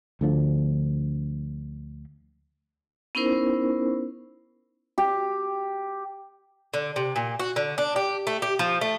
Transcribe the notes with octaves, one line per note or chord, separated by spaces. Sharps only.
D2 D3 F3
B3 C#4 D#4 E4 A#4 C5
G4
D3
C3
A#2
F#4
D3
D4
G4
A3
G4
F3
A3